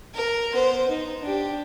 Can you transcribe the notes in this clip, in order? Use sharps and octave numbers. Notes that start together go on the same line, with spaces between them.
A#4
B3 C5
D#4
D4 G4